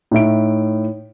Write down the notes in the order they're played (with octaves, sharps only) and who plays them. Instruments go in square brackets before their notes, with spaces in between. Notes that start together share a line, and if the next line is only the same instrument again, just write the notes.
[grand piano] A2 D#4 E5 D7